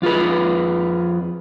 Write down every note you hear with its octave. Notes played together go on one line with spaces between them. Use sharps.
F2 F4 G#4 B4